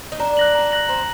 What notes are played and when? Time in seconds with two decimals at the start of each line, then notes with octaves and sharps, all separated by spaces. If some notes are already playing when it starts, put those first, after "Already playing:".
0.12 D#4
0.20 D4 A#5
0.37 F#6 A#6 F#7
0.55 A#5
0.72 F#6 A#6 F#7
0.89 C4 A#5